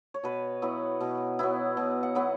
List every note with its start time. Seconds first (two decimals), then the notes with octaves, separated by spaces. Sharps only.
0.14 C#5
0.23 B2 B4
0.62 F#3 B3 E4
1.00 B2
1.39 F#3 B3 E4
1.77 B2
2.03 F#5
2.15 F#3 B3 E4